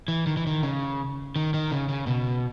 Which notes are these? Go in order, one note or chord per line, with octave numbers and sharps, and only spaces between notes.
E3
D#3
E3
D#3
C#3
D#3
D#3
C#3
C#3
B2